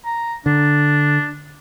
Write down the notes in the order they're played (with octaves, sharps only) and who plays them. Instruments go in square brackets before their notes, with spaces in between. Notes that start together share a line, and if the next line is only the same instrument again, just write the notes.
[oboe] A#5
[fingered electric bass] D3 [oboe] D4